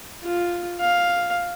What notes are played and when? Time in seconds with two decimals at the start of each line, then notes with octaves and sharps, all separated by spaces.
0.24 F4
0.80 F5